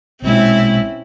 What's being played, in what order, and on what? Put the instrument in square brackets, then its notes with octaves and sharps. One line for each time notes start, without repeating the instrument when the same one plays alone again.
[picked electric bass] A#1 B2 G#3 [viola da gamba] C4 C#4 E4